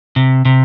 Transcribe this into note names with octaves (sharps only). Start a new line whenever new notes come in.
C3
C3